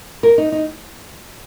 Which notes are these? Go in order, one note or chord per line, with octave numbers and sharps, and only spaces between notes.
A#4
D#4
D#4